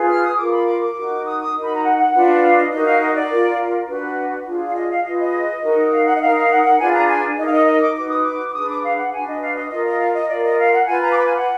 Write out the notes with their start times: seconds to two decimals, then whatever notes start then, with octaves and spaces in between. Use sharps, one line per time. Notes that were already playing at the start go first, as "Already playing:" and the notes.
Already playing: F4 G#4 B4
0.09 F6
0.23 D#6
0.37 F4 A#4 D6
0.52 B5
0.67 D6
0.81 D6
0.96 D#4 F#4 A#4
1.25 D#6
1.40 D#6
1.54 D#4 F#4 A#4
1.64 B5
1.74 A#5
1.83 F#5
1.98 F#5
2.13 D4 F4 B4
2.42 F5
2.56 D#5
2.71 D#4 F#4 A#4 D#5
2.85 F5
3.00 D#5
3.15 D5
3.29 F4 A#4
3.87 D4 F#4 B4
4.45 D4 F4 G#4
4.66 F5
4.75 D#5
4.89 F5
5.04 F4 G#4 B4 D#5
5.18 D#5
5.62 D#4 F#4 A#4
5.92 F5
6.06 F#5
6.15 D#5
6.20 D#4 A#4 F5
6.35 F5
6.50 F#5
6.64 F#5
6.78 D4 F4 G#4 B4 G#5
6.93 A#5
7.07 G#5
7.37 D#4 A#4 D#5
7.46 F5
7.51 D#5
7.66 D#5
7.80 D6
7.95 D#4 F#4 B4 D6
8.09 D#6
8.23 D6
8.48 D6
8.54 D4 G#4 B4 D#6
8.69 D6
8.83 F5
8.97 F#5
9.12 D4 F#4 B4 G#5
9.27 D#5
9.41 F5
9.55 D#5
9.70 F4 A#4 D#5
9.85 D#5
9.99 F5
10.14 D#5
10.28 F4 A#4 D5
10.43 D#5
10.58 F5
10.73 F#5
10.86 F4 B4 G#5
11.01 A#5
11.11 D6
11.16 B5
11.26 G#5
11.36 F#5